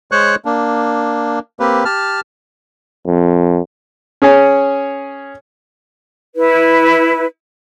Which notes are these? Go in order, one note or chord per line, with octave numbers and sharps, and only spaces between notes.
G#3 C5 C#5 C#6 F#6
A#3 D4
A#3 C4 G4 B4
G4 A5 F6
F2
C#4 G#4 C#5 G#5
E4 B4